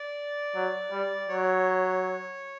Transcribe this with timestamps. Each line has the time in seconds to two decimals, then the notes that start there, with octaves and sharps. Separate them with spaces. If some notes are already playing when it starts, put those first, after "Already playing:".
Already playing: D5
0.56 F#3
0.92 G3
1.29 F#3 C#5